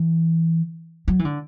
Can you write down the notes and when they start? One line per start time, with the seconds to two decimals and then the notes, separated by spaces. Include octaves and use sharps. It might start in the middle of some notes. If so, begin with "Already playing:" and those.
Already playing: E3
1.08 F#3
1.19 E3
1.25 D3